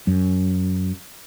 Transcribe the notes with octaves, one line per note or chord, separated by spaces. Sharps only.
F#2